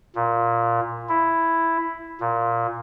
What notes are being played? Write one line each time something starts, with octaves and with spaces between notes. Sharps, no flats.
A#2
E4
A#2